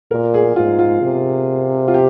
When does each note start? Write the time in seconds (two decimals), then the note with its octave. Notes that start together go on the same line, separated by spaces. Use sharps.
0.11 A#2 A#4
0.34 G#4
0.56 G#2 F4
0.79 F4
1.02 C3
1.88 F4
1.94 G4